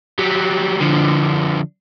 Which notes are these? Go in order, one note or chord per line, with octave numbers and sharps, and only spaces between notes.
F#3 G3
D3 F3